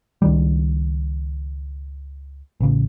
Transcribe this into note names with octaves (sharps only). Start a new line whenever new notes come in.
C#2 D#3 G3
A1 C#3